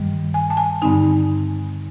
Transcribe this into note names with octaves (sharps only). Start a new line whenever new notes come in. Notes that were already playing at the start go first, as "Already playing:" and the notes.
Already playing: G2 D#3 G3
G#5
A5
G#5
G2 D3 G3 C4 D#4 G#5